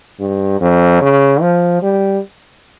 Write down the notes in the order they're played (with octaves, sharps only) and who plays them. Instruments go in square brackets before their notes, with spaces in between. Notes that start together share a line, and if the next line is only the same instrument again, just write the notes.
[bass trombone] G2
F2
C#3
F3
G3